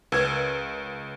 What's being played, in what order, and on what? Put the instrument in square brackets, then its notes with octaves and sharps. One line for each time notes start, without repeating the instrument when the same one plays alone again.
[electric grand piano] C#2 G#6 [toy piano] A#4 B4